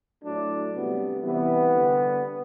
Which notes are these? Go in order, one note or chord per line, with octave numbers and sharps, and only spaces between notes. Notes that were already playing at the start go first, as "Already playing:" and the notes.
A2 F#3 A3 D4
C3 G3 B3
C3 E3 G3 B3
D3 G3